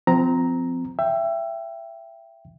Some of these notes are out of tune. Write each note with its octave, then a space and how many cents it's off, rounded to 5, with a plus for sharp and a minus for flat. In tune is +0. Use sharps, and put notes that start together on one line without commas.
F3 +0 C4 -30 A#5 +0
E5 +20 G5 +0